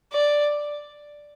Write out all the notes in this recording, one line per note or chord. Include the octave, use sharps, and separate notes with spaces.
D5